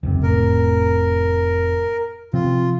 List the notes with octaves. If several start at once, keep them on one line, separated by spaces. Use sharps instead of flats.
F1 C#2 F#2 C3
A2 A#4
C3 F3 C4 F4